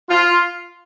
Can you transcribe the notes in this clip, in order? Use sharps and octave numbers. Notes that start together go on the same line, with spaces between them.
F4